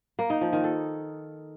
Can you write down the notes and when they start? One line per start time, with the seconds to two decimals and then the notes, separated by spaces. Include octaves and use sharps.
0.19 A#3
0.30 D#4
0.41 F3
0.53 D#3
0.64 A4